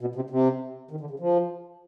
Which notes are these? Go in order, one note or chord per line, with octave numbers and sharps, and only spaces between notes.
B2
C3
C3
D#3
D3
C#3
F3